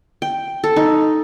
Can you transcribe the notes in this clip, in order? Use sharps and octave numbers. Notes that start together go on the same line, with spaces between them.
G5
A4
D#4